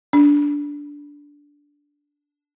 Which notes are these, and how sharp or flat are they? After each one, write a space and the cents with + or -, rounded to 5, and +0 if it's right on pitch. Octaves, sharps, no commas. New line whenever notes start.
D4 -15